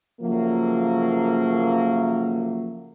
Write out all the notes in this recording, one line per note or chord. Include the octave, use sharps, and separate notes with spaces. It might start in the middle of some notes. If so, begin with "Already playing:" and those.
C#3 F3 F#3 A3 A#3